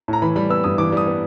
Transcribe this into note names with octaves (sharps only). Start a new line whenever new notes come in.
A2 A#5
E3 B5
G3 B5
B3 E6
G2 D#6
E3 D6
G3 D#6
B3